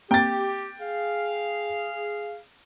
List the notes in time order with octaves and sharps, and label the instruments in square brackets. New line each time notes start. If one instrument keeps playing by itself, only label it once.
[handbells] A#3 C4 A#5 [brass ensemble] G4 [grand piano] G5 A6
[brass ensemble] G#4 F5